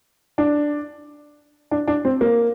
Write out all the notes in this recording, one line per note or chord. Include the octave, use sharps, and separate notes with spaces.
D4
D4
D4
C4
A#3